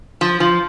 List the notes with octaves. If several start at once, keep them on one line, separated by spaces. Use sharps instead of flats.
F3
F3